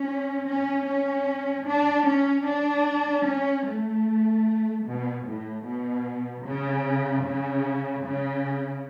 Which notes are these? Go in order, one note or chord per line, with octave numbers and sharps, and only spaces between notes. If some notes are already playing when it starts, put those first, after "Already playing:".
Already playing: C#4
C#4
C#4
D4
C#4
D4
C#4
A3
B2
A2
B2
C#3
C#3
C#3